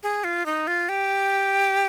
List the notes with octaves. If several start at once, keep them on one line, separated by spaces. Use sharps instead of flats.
G#4
F4
D#4
F4
G4